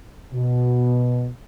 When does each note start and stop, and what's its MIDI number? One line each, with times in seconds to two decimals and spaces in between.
0.34 1.28 47